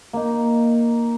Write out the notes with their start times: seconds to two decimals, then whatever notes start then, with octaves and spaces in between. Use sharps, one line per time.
0.13 A#3 D#4